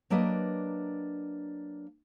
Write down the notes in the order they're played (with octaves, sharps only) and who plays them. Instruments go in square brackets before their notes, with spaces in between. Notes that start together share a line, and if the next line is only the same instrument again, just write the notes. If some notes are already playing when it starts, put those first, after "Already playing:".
[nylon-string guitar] F#3 A#3 D4 G4 B4 D#5